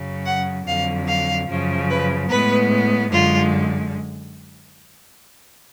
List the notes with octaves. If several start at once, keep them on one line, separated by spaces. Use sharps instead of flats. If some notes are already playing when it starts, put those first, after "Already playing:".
Already playing: F#2 C#3 F#3
F#5
F2 D3 F#3 F5
F5
F#2 C#3 F3
B4
A2 G#3 B3 B4
F#2 D3 G#3 F4